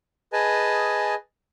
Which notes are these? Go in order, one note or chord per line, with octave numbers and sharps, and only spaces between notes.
G#4 B4 D#5 G#5 A5